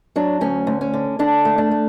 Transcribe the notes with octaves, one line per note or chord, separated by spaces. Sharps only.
F#3 D4
D2 C#4
D2
C#4
D3
D3 D4
A3
D4
A3